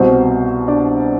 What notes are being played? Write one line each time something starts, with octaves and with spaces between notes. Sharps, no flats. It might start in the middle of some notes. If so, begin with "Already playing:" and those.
Already playing: C2 B2 C4 C5
D4 D5